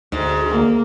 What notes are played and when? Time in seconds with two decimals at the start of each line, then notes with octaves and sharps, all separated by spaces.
0.12 D2 G#2
0.50 A#3